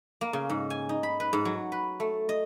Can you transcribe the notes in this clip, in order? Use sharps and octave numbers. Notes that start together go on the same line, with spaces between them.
A#3
C#3
G#2
G#5
D#4
B5
B4
G#2
F#3
B4
A3
D#5